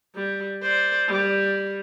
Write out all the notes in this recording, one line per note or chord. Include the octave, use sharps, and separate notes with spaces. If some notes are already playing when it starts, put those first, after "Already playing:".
G3
C5 D5
G3